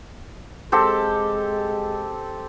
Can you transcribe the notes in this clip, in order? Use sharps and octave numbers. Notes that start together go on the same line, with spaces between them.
G#3 C4 G4 A4